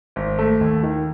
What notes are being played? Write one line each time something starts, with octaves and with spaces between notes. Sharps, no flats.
G#1
A3
D#2
D#3